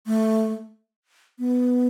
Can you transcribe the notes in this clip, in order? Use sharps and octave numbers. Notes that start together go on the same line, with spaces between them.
A3
B3